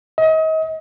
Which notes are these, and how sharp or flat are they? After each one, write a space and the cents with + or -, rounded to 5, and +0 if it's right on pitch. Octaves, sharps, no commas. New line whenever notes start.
D#5 +35